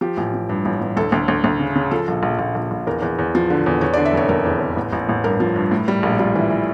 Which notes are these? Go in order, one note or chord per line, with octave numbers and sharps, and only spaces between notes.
F3 G4
A1
F3
G2
A1
A1
D2 A4
D2
D2
D2
C#3
C#3
F3 A4
A#1
A#1
A#1
A#1
A#1
E2 A#4
E2
E2
F3
D3
E2
E2 C#5
D5
D3
E5
F1 C#5
F1 A#4
E2
E2
A1
A1
A1
G2 A#4
F3
G2
A2
G3
A#1
G3 F4
E3
E3